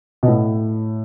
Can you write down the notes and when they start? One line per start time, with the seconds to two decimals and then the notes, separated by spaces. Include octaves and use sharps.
0.23 B2
0.28 A2